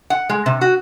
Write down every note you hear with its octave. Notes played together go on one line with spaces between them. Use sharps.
F#5
G#3
C3
F#4